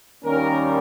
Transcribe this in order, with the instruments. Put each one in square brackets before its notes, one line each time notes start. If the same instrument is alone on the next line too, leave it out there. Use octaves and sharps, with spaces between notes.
[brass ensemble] D#2 D#3 G3 A#3 C#4 A#4